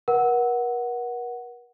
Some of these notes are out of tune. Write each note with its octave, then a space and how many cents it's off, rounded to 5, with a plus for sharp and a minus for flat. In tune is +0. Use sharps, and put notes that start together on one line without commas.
A#4 +45 F#5 +0